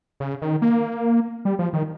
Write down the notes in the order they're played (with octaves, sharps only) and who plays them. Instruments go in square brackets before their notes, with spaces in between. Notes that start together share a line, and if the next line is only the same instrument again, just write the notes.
[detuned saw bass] C#3
D#3
A#3
G3
F3
D#3